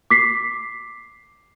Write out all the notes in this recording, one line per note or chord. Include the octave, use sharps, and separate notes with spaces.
D6 B6 C7